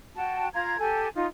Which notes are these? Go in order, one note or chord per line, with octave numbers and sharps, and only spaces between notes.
F#4 G5 A5
F4 F5 A#5 G#6
G4 A4 G#5
D#4 F4